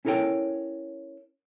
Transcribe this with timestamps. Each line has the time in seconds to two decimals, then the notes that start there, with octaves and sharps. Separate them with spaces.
0.05 C#4 E4 A4 A#4 C#5 G5